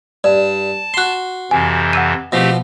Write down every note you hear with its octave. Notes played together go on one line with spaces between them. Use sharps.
G2 D5 A5
F#4 C6 F#6 C7
F2 C3 E3 G#5
F#5 E6 D#7
B2 F3 A3 C4 G4 A#6